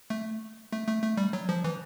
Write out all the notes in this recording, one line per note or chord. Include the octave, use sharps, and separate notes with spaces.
A3
A3
A3
A3
G3
F#3
F3
E3